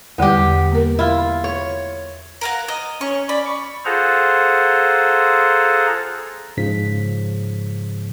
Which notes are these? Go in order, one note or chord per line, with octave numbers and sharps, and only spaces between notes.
E2 D3 G3 B3 G4
A#3 A#4
E4 F4
C#5
A#4 F5 F#5
D#5
C#4 C#6
D5 B5
C#6
F4 G#4 A4 C5 F#5 A#5
G#2 C#3 F3 B6